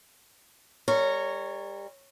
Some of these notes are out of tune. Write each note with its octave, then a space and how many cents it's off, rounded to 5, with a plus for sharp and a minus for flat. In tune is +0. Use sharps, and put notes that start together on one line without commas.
G3 +30 A#4 -20 C#5 +0